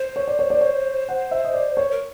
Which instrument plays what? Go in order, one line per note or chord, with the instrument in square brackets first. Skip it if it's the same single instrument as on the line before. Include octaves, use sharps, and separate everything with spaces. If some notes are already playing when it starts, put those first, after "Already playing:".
Already playing: [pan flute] C5
[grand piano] C#5
D5
C#5
D5
C#5
F#5
E5
D#5
D5
C#5
[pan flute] A#4